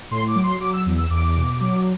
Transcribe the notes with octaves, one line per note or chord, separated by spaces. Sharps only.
A2 C6
D6
F#3
C6
F#3 D6
E6
E2
E6
E2 D6
B2
F#3